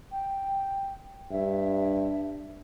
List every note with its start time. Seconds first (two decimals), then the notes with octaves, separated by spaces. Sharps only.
0.12 G5
1.31 G2 E5